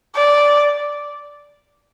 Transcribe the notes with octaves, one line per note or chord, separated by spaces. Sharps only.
D5